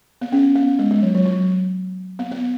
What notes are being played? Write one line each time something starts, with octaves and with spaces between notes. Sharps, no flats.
B3
C#4
B3
G#3
G#3
F#3
F#3
F#3
B3
B3